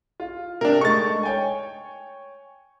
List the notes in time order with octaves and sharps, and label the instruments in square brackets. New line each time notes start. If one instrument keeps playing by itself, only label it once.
[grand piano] F4
[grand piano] C3 G5 [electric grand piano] D4 A#4
[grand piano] G#3 A3 D#4 [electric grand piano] C#6 A6
[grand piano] C#5 G5 G#5